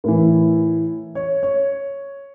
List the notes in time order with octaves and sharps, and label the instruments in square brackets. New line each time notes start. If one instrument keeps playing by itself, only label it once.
[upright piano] A2 E3 A#4
C#5
C#5